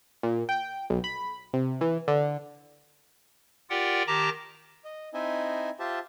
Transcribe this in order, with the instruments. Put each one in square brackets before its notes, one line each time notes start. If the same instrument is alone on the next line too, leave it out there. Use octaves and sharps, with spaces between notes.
[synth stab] A#2
G5
B1
B5
C3
E3
D3
[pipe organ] F4 G4 A#4 D5 F#5 G5
D#3 G4 A5 A#5 D6 A#6
[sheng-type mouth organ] D#5
C4 D#4 E4 D#5 E5 G#5
F4 G4 C5 E5 A5